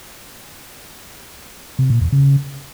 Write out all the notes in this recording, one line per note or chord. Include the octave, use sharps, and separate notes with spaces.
C3
A#2
E2
C#3